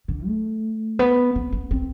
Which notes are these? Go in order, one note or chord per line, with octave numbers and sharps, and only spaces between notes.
D3
A3
B3
B3
B3
C4